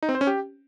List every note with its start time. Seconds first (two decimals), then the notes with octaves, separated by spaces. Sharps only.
0.03 D#4
0.09 C4
0.15 C5
0.21 C#4
0.27 G4